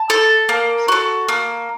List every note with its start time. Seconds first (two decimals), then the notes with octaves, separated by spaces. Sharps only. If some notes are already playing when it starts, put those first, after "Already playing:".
Already playing: A5
0.10 A4
0.49 A#3
0.88 F#4 A4
1.28 A#3